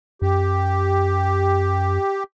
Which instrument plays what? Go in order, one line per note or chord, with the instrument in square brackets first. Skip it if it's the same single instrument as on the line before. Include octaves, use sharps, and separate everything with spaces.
[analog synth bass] F#2 [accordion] G4